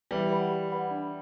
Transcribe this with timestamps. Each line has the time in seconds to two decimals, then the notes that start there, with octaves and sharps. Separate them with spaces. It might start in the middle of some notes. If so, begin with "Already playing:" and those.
0.11 E3 G3 G4
0.31 B4 D5 F#5 B5
0.51 G4
0.72 B4 D5 F#5 B5
0.91 D4